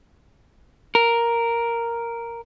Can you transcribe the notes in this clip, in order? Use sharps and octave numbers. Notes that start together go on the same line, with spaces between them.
A#4